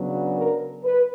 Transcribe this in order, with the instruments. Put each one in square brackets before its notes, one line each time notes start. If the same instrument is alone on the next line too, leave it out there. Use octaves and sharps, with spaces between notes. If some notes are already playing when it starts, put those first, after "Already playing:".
Already playing: [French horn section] C#3 F#3 B3 D4
A#4
B4